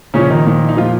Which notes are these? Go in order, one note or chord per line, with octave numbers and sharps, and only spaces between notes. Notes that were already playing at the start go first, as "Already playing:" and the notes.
A#2 C#3 F3 C#4
D#3 D#4
A#2 F3
D#4
A#2 F3 F4